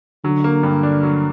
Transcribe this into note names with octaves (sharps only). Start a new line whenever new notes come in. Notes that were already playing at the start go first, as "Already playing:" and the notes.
D3 F#3
A#3
G2
D4
F#3